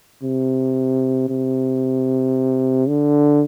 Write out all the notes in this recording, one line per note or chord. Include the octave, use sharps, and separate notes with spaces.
C3
C3
D3